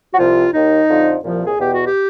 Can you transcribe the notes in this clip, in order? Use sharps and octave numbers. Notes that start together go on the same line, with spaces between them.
F#4
C2 C3 F3 F4
D#2 D#3 D#4
F2 D3 F3
C2 A#2 F3
G#4
E2 B2 G4
F#4
G4